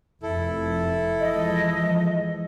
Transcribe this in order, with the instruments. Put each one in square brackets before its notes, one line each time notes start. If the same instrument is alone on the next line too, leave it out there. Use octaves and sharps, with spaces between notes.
[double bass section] F1 F2 [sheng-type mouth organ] E4 A4
[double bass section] E3 F3 G#3 [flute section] D#5